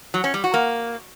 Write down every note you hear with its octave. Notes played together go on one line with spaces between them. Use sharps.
F#3
C#4
G3
F#4
A#3